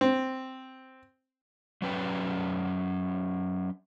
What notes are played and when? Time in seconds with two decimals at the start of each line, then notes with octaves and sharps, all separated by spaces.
0.01 C4
1.82 F#3 C#4 B4 G5